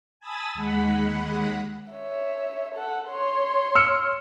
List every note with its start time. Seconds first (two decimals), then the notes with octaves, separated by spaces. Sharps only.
0.20 G#5 A5 B5 D#6 E6 A6
0.54 D#2 G#3 F#5 B5
1.91 C#5 E5
2.75 A4 F#5
3.09 C#5 C6
3.75 E6 F6 C#7